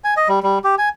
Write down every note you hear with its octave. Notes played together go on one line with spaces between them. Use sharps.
G#5
D#5
G3
G3
G4
G#5